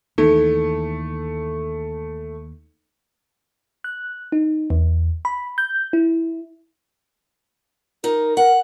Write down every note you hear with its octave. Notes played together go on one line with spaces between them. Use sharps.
D#2 E3 A3 D#4 A4
F#6
D#4
E2
B5
G6
E4
D#4 A#4
A#4 F#5